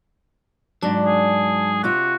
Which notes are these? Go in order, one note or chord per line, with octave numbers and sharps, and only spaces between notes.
G#2 F#3 D4
G#4
C3 F4 F#4